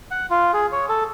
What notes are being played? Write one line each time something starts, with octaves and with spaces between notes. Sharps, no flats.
F#5
F4
G#4
C#5
A4